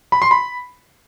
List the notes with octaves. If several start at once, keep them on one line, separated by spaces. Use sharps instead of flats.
B5
C6
B5